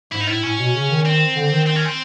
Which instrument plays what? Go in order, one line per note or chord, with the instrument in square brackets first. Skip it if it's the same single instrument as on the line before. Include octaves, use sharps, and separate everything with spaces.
[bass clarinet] G#2 [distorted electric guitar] E4
[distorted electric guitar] D#4
[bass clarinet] A2 [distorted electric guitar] E4
[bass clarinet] A2 [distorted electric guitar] C#4
[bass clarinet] B2
C#3
D#3
[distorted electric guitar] C4
[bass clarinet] D3
D#3
[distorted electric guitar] C4
C#4
C4